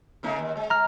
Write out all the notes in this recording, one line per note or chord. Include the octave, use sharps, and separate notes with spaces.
C#3 A3 D#4
D#2
G#3
A#5 F6